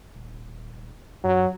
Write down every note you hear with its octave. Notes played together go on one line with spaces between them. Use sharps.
D#1
F#2 F#3